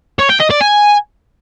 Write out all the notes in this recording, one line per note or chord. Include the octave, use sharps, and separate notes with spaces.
C#5
G5
D#5
D5
G#5